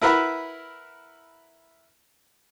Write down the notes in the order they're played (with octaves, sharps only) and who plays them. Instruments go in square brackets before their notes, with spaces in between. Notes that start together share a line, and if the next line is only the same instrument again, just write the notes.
[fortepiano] E4 A#4 B4 E5 F#5 B5